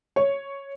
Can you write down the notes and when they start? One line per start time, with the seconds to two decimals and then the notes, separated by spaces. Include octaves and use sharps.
0.16 C#5